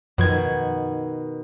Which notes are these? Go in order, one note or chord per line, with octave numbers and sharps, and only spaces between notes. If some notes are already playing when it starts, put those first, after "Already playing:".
F#2 B2 D#3 F3 G#6